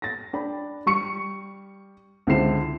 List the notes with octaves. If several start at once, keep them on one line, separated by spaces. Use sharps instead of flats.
A6 A#6
D4 G5 B5
G3 C#6 C#7
C#2 D3 C4 E4 C7 E7